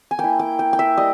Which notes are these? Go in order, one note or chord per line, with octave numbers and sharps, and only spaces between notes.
G#5
A#3 E4 G5
G5
G5
G5
E5
G3 D#5